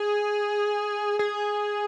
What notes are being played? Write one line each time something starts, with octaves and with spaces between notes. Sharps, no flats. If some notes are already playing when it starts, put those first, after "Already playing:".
Already playing: G#4
G#4